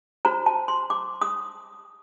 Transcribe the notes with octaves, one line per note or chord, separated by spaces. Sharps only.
F#4 C5 A#5
A5
C6
D6
D#6